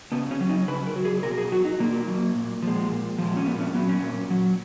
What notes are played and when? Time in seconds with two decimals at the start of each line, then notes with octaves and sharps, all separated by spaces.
0.12 C#3 B3
0.31 C#4
0.40 F#3
0.49 D#4
0.68 C#3 B4
0.87 A#4
0.96 F#3
1.05 G#4
1.23 B2 A#4
1.38 G#4
1.52 F#3 F#4
1.65 D#4
1.80 B2 A#3
2.07 F#3
2.35 A#2
2.62 F3 G#3
2.91 A#2
3.18 F3 G#3
3.36 C#4
3.46 A#2 B3
3.60 C#4
3.74 F#3 B3
3.89 C#4
4.02 A#2
4.30 F#3